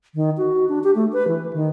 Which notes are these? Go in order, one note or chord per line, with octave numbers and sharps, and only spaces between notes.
D#3
F#4
D4
G4
A3
B4
E3
D#3